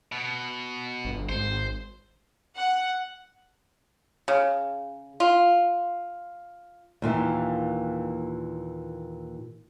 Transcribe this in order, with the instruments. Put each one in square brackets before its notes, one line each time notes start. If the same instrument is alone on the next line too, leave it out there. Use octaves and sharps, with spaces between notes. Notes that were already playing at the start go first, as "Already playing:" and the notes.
[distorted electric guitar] B2
[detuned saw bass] G1
[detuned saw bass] G#1 [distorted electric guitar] C5
[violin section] F#5
[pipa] C#3
F4
[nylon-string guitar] D#2 A#2 E3